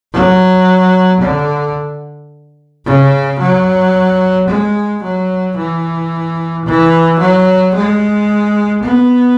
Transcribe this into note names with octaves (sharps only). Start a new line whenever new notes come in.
F#3
D3
C#3
F#3
G#3
F#3
E3
E3
F#3
G#3
B3